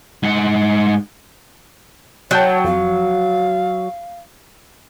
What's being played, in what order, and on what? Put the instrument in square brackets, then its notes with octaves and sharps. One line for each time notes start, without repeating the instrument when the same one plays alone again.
[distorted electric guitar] G#2 F#5
[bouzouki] F#3 [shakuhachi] C#5 [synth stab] F#5 G5 A5
[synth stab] F2 [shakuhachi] F5